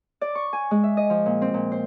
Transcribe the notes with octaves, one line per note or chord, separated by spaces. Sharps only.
D5
C#6
G#5
G#3
E5
D#5
F3
A#2
C4
A#2
C5